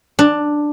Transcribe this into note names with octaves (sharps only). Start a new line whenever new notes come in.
D4